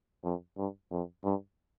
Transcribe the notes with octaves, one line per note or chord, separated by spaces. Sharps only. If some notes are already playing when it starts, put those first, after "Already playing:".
F2
G2
F2
G2